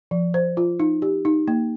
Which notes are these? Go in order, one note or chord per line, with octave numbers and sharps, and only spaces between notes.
F3
C5
F4
D#4
G4
D#4
A#3